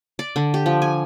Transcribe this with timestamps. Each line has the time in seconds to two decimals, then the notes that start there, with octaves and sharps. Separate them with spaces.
0.19 D5
0.36 D3
0.54 G4
0.66 F3
0.82 G#5